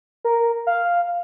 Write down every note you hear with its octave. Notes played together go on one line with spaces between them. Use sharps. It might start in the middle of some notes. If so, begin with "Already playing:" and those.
A#4
F5